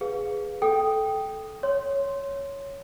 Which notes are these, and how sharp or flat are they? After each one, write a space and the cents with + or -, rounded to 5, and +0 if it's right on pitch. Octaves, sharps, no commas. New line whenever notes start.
G#4 +0 B4 +0 F5 +25
A4 -20 G5 +0 D#6 +0
C#5 +0 C6 +0